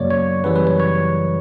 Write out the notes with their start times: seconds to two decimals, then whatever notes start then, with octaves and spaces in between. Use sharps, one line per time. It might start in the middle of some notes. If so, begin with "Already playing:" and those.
Already playing: F#2 C#3 F#3 A#3 C#5 D5
0.11 C#5
0.44 F#2 C#3 E3 G3 B4
0.56 B4
0.67 C#5
0.80 C#5